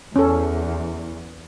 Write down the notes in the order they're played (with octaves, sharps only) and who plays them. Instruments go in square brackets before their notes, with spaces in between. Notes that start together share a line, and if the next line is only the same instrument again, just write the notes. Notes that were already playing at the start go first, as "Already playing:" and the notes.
[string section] E2 [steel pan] C#4 A4